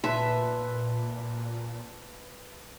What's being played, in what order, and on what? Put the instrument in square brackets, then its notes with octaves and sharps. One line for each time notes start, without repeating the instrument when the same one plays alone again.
[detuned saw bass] A#2 [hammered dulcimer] B4 A5 C6 [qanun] E5